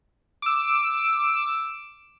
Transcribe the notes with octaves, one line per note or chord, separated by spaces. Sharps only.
D6 E6